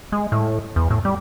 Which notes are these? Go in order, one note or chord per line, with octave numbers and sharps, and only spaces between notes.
G#3
A2
E2
A2
G3